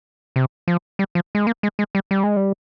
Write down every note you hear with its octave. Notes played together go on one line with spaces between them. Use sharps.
C3
F3
G3
F3
G#3
A#3
G#3
G#3
G3
G3
G#3
G3